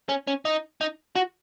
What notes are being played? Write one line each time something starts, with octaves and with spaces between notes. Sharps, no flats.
C#4
C#4
D#4
D#4
F#4